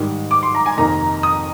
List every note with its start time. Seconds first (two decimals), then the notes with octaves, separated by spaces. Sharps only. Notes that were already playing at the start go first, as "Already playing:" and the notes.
Already playing: G#2 D#3 G3
0.31 D6
0.43 C6
0.55 A#5
0.66 G#5
0.77 F2 C3 D#3 A#3 D#4 A#5
1.23 D#6